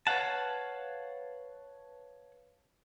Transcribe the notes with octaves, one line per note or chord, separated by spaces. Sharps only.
B4 C#5 D5 F5 F#5 A5